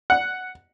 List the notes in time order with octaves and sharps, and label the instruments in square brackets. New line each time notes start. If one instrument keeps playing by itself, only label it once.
[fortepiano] F#5